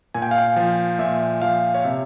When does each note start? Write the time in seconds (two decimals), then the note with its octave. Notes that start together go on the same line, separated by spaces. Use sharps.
0.14 A#2 G#5
0.22 G5
0.31 F5
0.38 G5
0.56 F3
0.99 A#2 E5
1.42 F3 F5
1.74 C#5
1.84 C3 E5